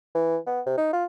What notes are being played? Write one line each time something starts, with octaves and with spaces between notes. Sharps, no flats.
E3
B3
C3
D#4
F4